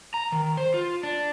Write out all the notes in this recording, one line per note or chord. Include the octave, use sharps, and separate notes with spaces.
A#5
D#3
C5
F4
D4